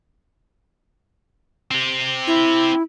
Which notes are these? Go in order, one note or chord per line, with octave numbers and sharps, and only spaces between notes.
C4 G4
E4